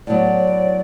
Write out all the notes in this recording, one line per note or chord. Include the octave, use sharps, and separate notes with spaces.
A2 F#3 B3 D5